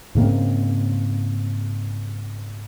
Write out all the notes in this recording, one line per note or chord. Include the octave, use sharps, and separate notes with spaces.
G#2 C#3 A#3 C4